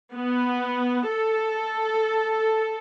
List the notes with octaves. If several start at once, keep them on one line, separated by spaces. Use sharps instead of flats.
B3
A4